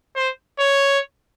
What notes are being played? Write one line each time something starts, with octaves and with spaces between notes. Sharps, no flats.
C5
C#5